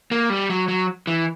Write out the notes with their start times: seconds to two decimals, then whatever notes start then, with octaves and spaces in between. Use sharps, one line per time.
0.11 A#3
0.30 G3
0.50 F#3
0.68 F#3
1.07 E3